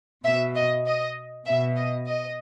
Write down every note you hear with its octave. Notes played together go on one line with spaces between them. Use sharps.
B2 E5
D#5
D#5
B2 E5
D#5
D#5